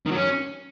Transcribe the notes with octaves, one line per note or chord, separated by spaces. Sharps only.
D#3
F#3
C#4